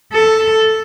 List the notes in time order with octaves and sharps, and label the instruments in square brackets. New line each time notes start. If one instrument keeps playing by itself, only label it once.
[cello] A4